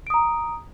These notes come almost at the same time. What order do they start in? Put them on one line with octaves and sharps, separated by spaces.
D7 D#6 A#5